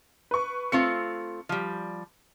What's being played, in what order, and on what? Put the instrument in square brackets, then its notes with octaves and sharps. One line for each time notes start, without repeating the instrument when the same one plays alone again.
[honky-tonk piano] B4 C#6
[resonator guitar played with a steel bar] A3 C4 F4 [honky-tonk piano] C#7
[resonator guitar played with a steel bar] F3 G3